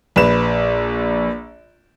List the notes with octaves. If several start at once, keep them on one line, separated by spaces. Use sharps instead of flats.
A#1 B4 E7